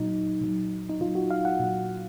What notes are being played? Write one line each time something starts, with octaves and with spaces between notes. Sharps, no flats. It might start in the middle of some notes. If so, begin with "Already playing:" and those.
Already playing: A#2 F#3 D#4
A#2 F#3
D#4
A#2 F#3 F4
F#4
F5
F#5
A#2 F#3